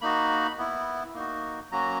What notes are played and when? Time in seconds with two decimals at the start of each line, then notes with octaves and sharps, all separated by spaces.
0.01 A#3 D#4 F#4 B5
0.58 B3 E4
1.14 A#3 D#4 F#4
1.71 F#3 A#3 C#4 F#4 A#5